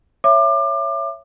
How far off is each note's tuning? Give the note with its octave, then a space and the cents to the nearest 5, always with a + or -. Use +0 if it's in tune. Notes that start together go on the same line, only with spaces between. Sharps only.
C#5 +0 E5 +15 D6 +30